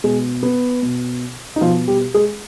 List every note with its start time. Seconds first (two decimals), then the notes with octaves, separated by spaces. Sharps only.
0.04 B2 G#3
0.43 B3
0.82 B2
1.56 D#4
1.61 B2 F3 F4
1.88 G3 G4
2.14 G#3 G#4